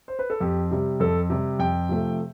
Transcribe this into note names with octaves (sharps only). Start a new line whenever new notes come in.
C5
B4
A4
F2 G4
C3 G3
F2 A4
C3 G3
F2 G5
C3 F3 A3